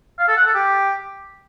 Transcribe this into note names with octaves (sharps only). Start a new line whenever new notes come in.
F5
A4
F#5
A4
G4